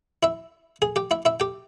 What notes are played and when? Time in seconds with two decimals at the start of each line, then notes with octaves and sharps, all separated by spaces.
0.23 E4 E5
0.82 G#4 G#5
0.96 G4 G5
1.11 E4 E5
1.25 E4 E5
1.40 G4 G5